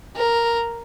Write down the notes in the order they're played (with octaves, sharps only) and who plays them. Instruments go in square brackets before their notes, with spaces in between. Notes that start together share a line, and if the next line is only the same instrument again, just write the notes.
[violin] A#4